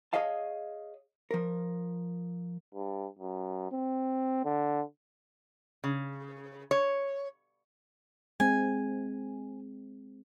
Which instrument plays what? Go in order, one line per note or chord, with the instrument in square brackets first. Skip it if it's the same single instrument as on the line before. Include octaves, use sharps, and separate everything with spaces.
[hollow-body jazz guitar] G#4 C#5 D#5 F5 A5
F3 A#4
[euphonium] G2
F#2
C4
D3
[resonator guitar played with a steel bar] C#3
C#5
[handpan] G#3 C4 [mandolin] G#5